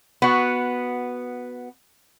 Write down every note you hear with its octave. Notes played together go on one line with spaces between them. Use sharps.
B3 F#4